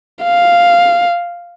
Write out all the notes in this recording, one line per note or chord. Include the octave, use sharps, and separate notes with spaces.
F5